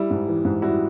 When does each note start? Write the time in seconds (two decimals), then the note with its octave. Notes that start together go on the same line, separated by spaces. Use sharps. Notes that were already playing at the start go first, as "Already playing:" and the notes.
Already playing: G3 E4
0.10 G#2
0.28 E3
0.45 G#2
0.62 G3 E4 F#4